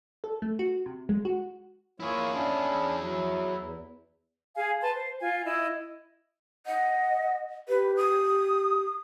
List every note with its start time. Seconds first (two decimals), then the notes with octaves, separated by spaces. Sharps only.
0.24 A4
0.42 A3
0.59 F#4
0.86 C3
1.09 G#3
1.25 F#4
2.00 A#3 E4 F4 G#4 C#5
2.32 C#4 D4
2.98 F#3
3.56 E2
4.56 G#4 F5 G#5
4.81 B4 A5 C6
4.94 C5
5.19 F4 G#5
5.45 E4 D#5
6.66 D#5 F#5
7.69 G4 B4
7.97 D#6